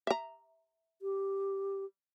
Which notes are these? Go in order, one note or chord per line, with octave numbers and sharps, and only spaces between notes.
E5 A#5
G4